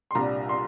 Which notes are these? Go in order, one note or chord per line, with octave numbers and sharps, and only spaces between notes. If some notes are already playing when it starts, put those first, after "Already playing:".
C6
C2 A#2 G3 D4 A#5
C6